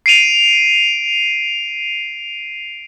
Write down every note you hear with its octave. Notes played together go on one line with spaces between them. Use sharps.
C7 D7 D#7 F7